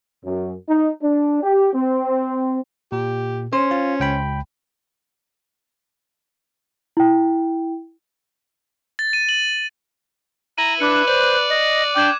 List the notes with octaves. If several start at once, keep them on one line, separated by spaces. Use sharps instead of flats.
F#2
D#4
D4
G4
C4
A#2 G4
C#4 C5
F4
C#2 G5 B5
E4 G5
A6
D#7
F#7
E4 A#5 D#7
D4 B4 D6 F#6 C#7
C5 D5
D#5
D4 G5 D6 G#6 E7